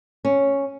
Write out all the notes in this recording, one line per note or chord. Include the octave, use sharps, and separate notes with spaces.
C#4